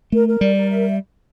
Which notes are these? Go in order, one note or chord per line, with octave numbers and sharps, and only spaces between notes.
A3 A#4
A#4
G3 D5
A#4
E5